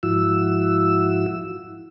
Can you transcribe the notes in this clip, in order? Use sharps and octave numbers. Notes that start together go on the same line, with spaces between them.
G#2 F3 E4 F#4 E6